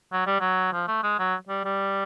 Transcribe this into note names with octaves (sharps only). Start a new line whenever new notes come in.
F#3
G3
F#3
F3
A3
G#3
F#3
G3
G3